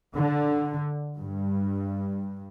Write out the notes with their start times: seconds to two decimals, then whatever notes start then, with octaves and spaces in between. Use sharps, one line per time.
0.15 D3
1.19 G2